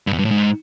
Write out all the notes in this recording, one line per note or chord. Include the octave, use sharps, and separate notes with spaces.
G2
E2
G2
A2
G#2